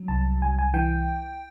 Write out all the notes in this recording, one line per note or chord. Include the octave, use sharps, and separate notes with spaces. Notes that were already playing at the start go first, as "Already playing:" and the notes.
Already playing: F#3
C2 A5
C2 G#5
G#5
E3 G5